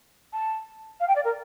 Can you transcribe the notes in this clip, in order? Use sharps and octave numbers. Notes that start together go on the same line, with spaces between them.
A5
F5
G5
D5
A#4